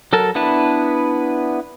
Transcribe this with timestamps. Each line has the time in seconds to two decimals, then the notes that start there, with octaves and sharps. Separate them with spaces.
0.13 F#3 A4 A#4 A5
0.35 B3 D4 E4 B4 A5